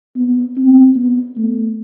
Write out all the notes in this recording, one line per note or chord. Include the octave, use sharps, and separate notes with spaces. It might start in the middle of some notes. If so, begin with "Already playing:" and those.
B3
C4
B3
A3